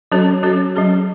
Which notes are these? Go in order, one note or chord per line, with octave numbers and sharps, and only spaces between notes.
F#3 C#4 F#4 A4 C#5
F#3 C#4 F#4 A4 C#5
F#3 C#4 G#4